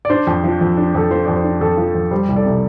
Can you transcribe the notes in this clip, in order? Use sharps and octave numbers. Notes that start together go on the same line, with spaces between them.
D5
D4 C5
F2
F3
F2
D4
F2 A4
F3 C5
F2 D5
C5
D4
F2 A4
F3
F2
G3 C5
C2
A4 D5
C3